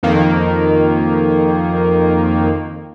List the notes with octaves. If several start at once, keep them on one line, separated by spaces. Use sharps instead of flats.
F2 D#3 A#3